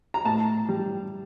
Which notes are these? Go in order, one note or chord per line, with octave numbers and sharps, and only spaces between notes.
A#5
A2 A5
G3